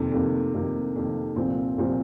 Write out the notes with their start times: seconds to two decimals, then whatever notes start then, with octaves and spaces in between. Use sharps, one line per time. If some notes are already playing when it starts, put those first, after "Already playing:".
Already playing: F2 C3 D#3 A#3
0.12 F2 C3 D#3 A#3
0.54 F2 C3 D#3 A#3
0.96 F2 C3 D#3 A#3
1.36 C2 A#2 F3 C4
1.78 C2 A#2 F3 C4